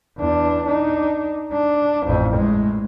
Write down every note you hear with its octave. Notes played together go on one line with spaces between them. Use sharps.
E2 D4
D4 D#4
D4
A1 F2
A2 G#3